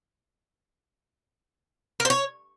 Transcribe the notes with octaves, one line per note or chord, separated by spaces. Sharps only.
A#4
C5
C#5